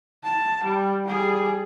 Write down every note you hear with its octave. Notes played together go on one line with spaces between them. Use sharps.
A5
G3
G3 G#4